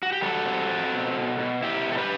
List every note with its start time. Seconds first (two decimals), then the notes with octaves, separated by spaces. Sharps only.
0.03 F#4
0.12 G4
0.22 G3 F#4 A4
0.46 C4
0.69 C4
0.92 B2
1.16 B2
1.39 B2
1.63 B2 E4 G4
1.86 B2
1.92 A4
1.98 G4 B4